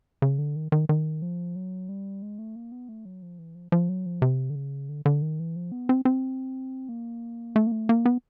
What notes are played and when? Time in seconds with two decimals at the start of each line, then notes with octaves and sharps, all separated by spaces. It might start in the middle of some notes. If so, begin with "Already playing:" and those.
0.22 C#3
0.39 D3
0.56 D#3
0.72 D#3
0.89 D#3
1.22 F3
1.56 F#3
1.89 G3
2.22 G#3
2.39 A3
2.55 A#3
2.72 B3
2.89 A3
3.05 F#3
3.22 F3
3.39 E3
3.55 F3
3.72 F3
3.89 F#3
4.06 F3
4.22 C3
4.50 D3
4.55 C#3
4.89 D3
5.05 D3
5.22 D#3
5.39 E3
5.56 F3
5.72 B3
5.89 C4
6.05 C4
6.89 A#3
7.56 A3
7.67 A#3
7.72 A3
7.89 A#3
8.05 B3